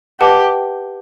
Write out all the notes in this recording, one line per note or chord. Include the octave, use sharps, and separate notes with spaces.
G4 B4 D#5 F#5 A5 D6